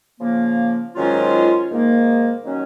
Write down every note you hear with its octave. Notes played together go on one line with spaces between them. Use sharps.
C#3 F3 A#3
G#2 D#3 F#3 C#4 F4
G#2 D#3 A#3
D#3 F#3 C#4